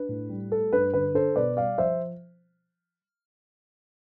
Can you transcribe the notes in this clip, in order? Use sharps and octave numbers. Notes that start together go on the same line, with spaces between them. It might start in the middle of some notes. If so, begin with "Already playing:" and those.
Already playing: D4 B4
A2
G3
A3 A4
G2 B4
D3 B4
D4 A4 C5
B2 B4 D5
G3 D5 F5
F3 C5 E5